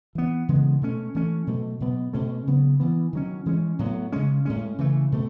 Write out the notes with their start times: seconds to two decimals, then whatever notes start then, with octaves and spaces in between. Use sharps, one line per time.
0.15 E3 B3
0.49 C#3 E3 G#3 B3
0.82 B2 A3 C#4
1.15 E3 A3 C#4
1.47 B2 F#3 A3
1.80 B2 F#3 B3
2.13 B2 A3 C#4
2.47 C#3 F#3 B3
2.80 E3 B3
3.13 D#3 F#3 C#4
3.46 E3 G#3 C#4
3.79 A2 F#3 B3
4.12 C#3 G#3 C#4
4.45 A2 G#3 C#4
4.78 C#3 E3 A3
5.12 B2 A3